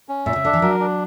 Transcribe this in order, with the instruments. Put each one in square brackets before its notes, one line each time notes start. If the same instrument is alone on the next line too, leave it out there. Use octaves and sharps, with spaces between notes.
[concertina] C#4
[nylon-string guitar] A#2 [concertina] E5
[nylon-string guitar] C#3
[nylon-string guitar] D3 [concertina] D4
[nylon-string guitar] E3
[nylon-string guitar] F#3 [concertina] A#4
[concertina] D4